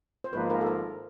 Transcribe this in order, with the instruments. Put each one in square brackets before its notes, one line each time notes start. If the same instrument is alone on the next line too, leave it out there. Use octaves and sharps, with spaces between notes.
[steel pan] C5
[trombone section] G#1 G#2 F3 A#3 [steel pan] B4
[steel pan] A#4
A4
A#4